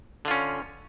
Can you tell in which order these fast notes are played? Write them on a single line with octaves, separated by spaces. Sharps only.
D3 F4 C#4